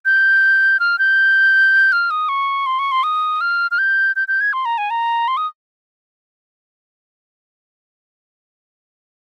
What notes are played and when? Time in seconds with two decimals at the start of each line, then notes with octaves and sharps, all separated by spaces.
0.05 G6
0.80 F6
0.99 G6
1.92 F6
2.11 D#6
2.29 C#6
2.66 C6
2.79 C#6
2.92 C6
3.03 D#6
3.41 F6
3.71 F6
3.78 G6
4.16 G6
4.28 G6
4.41 G#6
4.53 C6
4.65 A#5
4.78 G#5
4.90 A#5
5.28 C6
5.37 D#6